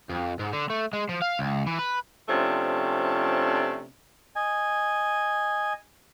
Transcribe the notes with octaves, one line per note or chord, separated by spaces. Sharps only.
F2
G#2
D3
A3
G#3
F3
F5
C#2
E3
B4
C3 F3 A3 C#4 D4
D#5 G#5